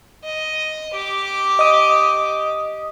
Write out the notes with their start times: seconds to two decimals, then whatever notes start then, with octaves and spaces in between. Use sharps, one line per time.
0.24 D#5
0.95 G4 D6
1.59 D#5 D#6